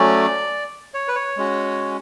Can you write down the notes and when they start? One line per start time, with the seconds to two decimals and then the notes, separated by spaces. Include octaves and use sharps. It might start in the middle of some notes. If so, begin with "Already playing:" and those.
Already playing: F#3 A3 C#4 D5
0.94 C#5
1.08 B4
1.15 C#5
1.37 G#3 C#4 F#4